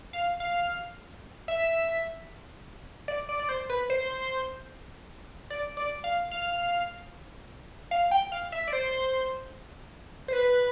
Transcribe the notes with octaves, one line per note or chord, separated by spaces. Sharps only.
F5
F5
E5
D5
D5
D5
C5
B4
C5
D5
D5
F5
F5
F5
G5
F5
E5
D5
C5
C5
B4